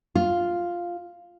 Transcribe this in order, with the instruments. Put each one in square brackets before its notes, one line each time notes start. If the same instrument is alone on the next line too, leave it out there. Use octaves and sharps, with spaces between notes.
[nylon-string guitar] F4